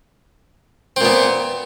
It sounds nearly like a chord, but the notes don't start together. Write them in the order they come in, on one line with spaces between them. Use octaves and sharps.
C4 A#2 B3